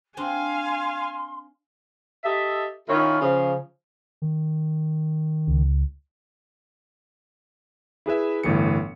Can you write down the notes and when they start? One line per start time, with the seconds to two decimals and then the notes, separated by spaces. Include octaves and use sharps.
0.17 C4 D4 F5 G#5 C6
2.24 G4 A4 D#5 E5
2.88 A#2 D#3 C#4 E4 F4 A#4
3.21 C#3 F3
4.22 D#3
5.47 C#2
8.06 E4 G#4 B4 E5
8.43 G1 A2 E3 C#7